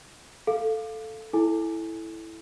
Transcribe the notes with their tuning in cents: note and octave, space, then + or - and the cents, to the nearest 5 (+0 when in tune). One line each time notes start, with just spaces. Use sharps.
A4 +0 F5 +0
E4 +0 A4 -10 G#5 +0